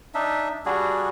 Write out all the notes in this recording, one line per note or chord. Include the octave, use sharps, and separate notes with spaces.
D4 D#4 E5
G3 D4 F#4 G#4